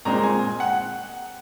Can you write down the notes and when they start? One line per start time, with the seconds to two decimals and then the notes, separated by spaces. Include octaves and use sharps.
0.05 A#2 G#3 C4 A#5
0.24 G#5
0.60 F#5